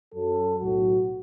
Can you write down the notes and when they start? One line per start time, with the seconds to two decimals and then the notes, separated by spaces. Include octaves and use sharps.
0.15 F#2 F#3 A4
0.60 B1 A2 F#3 F#4